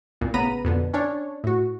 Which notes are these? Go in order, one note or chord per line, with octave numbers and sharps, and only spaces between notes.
C2 A#2
A1 C#3 B3 A#5 B5 D#7
F2 B2 D3
C#4 D4 C#5
A2 F#4